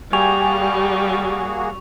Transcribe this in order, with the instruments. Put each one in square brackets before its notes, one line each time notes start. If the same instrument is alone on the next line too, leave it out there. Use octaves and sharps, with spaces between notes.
[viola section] G3 [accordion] A#3 F#4 G#4 [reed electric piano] G5 G#5 [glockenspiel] C#6 F7